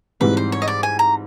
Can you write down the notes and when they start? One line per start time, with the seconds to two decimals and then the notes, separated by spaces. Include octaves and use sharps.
0.20 G#2 E3 G3 C4 B4
0.37 C5
0.52 C#5
0.62 D#5
0.68 D5
0.83 G#5
0.99 A#5